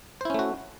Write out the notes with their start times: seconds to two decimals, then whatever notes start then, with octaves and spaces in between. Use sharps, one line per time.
0.21 C5
0.25 E4
0.30 C#4
0.34 A3
0.39 F#4